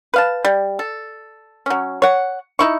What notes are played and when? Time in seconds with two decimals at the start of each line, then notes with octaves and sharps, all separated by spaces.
0.14 B4 F5 A5
0.45 G3
0.79 A4
1.66 F#3 C#4
2.02 C#5 F#5
2.59 D#4 E4 C#6